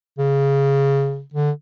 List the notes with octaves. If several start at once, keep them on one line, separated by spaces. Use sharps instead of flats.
C#3
D3